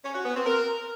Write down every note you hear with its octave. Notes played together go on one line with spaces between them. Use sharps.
C#4
F#4
B3
C4
A#4